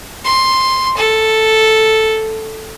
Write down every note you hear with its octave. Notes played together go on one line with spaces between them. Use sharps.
C6
A4